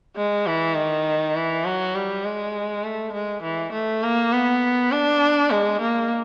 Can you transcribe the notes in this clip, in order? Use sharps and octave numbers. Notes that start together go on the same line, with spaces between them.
G#3
E3
D#3
E3
F#3
G3
G#3
A3
G#3
E3
A3
A#3
B3
D4
G#3
A#3